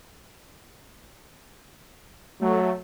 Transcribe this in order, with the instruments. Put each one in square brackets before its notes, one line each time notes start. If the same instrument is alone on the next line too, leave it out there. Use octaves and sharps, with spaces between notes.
[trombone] F#3 [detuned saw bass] A3